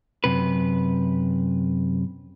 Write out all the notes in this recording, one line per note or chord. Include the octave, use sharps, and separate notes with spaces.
F#2 C3 B4